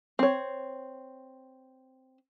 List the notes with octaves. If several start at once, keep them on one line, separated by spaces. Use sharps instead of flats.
C4 C#5